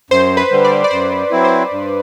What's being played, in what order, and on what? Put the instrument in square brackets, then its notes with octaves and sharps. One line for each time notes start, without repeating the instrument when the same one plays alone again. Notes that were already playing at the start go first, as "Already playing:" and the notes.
[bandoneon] F#2 [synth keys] C5
[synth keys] B4
[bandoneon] D3 G3
[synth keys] D5
D5
[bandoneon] F#2 [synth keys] C5
[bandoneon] F#3 C4 E4
[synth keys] C5
[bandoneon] G2